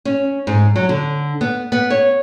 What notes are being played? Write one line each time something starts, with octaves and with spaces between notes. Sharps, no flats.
C#4
G#2
F#3
D3
B3
B3
C#5